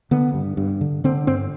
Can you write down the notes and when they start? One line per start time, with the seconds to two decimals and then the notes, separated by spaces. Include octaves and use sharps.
0.11 D3 B3
0.34 G2
0.57 G2
0.81 D3
1.04 D3 C4
1.27 G2 C4